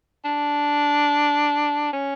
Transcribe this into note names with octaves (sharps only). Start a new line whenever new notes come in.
D4
C#4